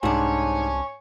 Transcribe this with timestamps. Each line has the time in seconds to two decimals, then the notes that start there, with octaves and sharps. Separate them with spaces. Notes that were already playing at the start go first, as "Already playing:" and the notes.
0.03 C2 G#2 C3 D4 C#5 G#5 C#6